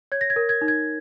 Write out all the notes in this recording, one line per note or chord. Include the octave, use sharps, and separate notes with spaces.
C#5 G#6
A#6
G#6
A#4
G#6
D#4
G#6